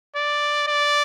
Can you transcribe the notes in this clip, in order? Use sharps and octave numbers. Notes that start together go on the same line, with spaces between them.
D5
D5